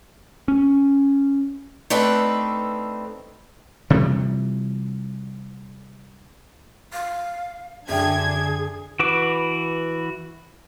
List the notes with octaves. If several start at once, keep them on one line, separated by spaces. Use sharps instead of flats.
C#4
A3 C4 D4 D#4 A4 B4
C3 E3 F3 G3
F5
F#2 D3 D4 G#4 E5 G5 G#6
E3 F#4 B4 D6